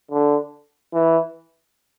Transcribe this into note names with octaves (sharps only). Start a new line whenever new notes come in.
D3
E3